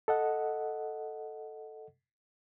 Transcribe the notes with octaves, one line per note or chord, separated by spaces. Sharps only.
A4 D#5 F#5